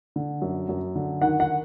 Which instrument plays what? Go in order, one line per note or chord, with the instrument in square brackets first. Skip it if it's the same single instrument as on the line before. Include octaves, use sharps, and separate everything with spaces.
[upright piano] D3
F#2
F#2
D3
D#3 F#5
F#5